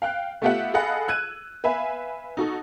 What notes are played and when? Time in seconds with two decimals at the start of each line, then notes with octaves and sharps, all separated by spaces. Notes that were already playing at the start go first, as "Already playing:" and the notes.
0.02 F5 G5 F#6
0.42 A3 B3 F4 G4 E5 F#5
0.74 G#4 A4 D#5 F5 F#5 B5
1.08 E6 F#6 G#6 D#7
1.64 B4 E5 F5 G#5 B5
2.37 D#4 F#4 A4